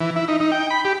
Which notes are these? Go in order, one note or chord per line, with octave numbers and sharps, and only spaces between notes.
E3
E4
D#4
D#4
G5
B5
G4